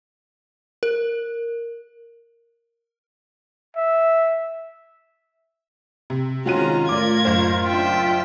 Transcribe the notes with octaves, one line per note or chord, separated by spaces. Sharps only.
A#4
E5
C3
C3 D#3 G#3 C#4 F4 F#4 A#5 D#7
A2 A3 A#4 D5 D6 G#6
F#1 C5
D4 E5 G5